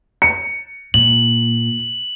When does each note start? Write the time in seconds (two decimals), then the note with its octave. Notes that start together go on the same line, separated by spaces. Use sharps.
0.22 C#7
0.94 A#2 F#7